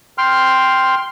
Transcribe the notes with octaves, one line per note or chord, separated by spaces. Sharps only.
G5 C6 F6